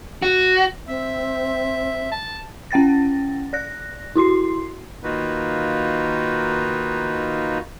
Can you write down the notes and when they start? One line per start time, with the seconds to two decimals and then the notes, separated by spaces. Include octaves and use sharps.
0.22 F#4
0.88 C4 E5
2.12 A5
2.71 C#4 F#5 G5 A6 A#6
3.53 D5 F#6 A#6
4.16 E4 F#4 C6 C7
5.03 D#3 A#3 D#4 F4 F#4 B4